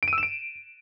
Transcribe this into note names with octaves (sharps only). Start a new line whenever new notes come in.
D7
D#7
E6
E7
D7